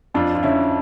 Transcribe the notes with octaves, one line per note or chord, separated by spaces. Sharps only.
F2 D4 F4
F4
D3 C#4 E4